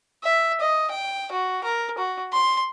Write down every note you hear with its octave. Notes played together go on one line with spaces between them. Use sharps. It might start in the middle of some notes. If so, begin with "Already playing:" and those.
E5
D#5
G5
F#4
A#4
F#4
C6